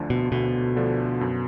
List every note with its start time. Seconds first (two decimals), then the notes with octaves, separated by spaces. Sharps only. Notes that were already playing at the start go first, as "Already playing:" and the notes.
Already playing: D2 D3 F3 A3 D4
0.10 B2
0.32 D2 B2
0.76 D3 F3 A3 D4
1.21 F#2